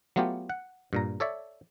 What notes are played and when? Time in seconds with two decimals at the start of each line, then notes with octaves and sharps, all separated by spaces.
0.16 F#3 A3 B3 F4 G4
0.49 F#5
0.93 G2 A#2 A#5
1.20 A4 C#5 D5 E5